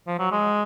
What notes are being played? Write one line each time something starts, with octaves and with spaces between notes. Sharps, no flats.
F3
F#3
G#3